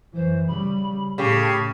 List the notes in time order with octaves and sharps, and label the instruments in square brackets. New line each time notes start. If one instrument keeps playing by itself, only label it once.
[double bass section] F#2 E3 [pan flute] C5
[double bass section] C#3 G3 [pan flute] B5
[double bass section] A2 [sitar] C#3 [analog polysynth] G4 A4 B5 [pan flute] C#6